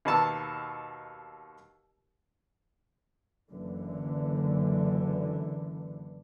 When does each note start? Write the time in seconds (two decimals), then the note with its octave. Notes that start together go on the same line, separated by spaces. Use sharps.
0.05 D#2 B2 A5 E6
3.50 F#1 D3 E3